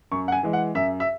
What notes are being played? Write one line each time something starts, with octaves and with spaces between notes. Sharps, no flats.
F#2 C#6
F#5
G#5
E3 G#3
F#5
F#2 E5
E5